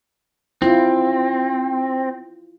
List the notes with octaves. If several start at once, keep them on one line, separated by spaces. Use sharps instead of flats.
C4 E4 F4